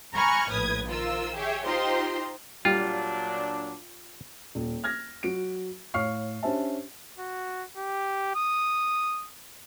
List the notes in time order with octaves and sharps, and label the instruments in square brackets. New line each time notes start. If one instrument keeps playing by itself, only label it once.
[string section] G#5 A#5 B5 C#6 F6 F#6
A#1 A2 B4 D#6 G#6
D#3 F4 A#4 C5 E6
G4 G#4 C#5 E5
D#4 F4 G4 C5 A#5 C6
[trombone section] A#2 F#3 D4 [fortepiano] G3 [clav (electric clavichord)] F4
[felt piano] D#1
F6 G#6 A#6
F#3 F#4 D7
A2 C#5 F5 C#6 F6 C7
C#4 D4 G4 C5 E5 A5
[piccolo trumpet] F#4
G4
D#6